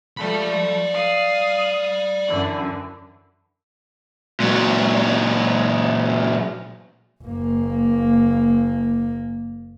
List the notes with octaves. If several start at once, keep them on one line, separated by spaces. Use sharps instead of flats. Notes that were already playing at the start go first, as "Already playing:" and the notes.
F3 A3 A4 D5 B5
F5 D#6
F#2 D3 E3
A#2 F#3
F#1 A#3